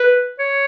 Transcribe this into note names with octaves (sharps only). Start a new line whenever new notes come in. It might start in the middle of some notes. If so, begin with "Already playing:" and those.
Already playing: B4
C#5